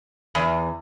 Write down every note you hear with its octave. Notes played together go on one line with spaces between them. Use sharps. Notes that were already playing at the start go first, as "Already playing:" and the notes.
E2